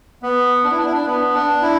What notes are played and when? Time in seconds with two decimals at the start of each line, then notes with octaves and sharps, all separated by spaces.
0.22 B3
0.64 D4
0.71 E4
0.78 D4
0.86 E4
0.93 D4
1.06 B3
1.34 D4
1.62 E4